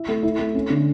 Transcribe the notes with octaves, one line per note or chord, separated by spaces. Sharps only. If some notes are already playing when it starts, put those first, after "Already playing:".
Already playing: E4
A3
E4
A3
C#4
D3